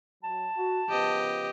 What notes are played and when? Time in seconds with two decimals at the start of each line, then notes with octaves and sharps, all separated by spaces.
0.23 F#3 A5
0.56 F#4
0.90 C#3 F3 B3 G4 D#5